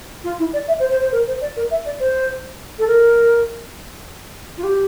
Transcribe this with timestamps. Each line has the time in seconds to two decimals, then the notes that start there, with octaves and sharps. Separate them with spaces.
0.24 F4
0.39 E4
0.53 D5
0.68 E5
0.80 C5
0.91 C5
1.02 C5
1.12 A#4
1.27 C5
1.41 D5
1.56 A#4
1.71 E5
1.86 D5
2.00 C5
2.79 A4
2.87 A#4
4.58 F4
4.64 G4